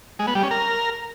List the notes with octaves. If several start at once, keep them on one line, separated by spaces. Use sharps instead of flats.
G#3
B3
G3
C#4
A#4